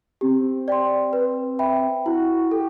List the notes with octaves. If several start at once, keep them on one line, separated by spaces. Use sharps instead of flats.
C4 G4
D5 G5 C6
B4
E5 G5 B5
E4 F#4
G4 A4